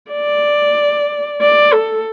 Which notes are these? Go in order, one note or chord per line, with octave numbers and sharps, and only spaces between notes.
D5
D5
A4